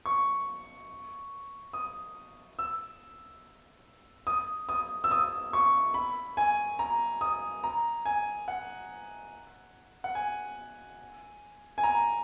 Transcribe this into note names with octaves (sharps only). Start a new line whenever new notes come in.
C#6
D#6
E6
D#6
D#6
E6
D#6
C#6
B5
G#5
A#5
D#6
A#5
G#5
F#5
F#5
G#5
G#5
A#5